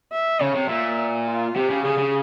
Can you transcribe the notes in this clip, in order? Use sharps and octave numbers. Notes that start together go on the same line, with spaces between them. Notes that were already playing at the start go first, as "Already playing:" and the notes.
E5
C#3 C#5
C3
A#2 E5
F4
C3 G4
C#3
C#3 G#4
C#3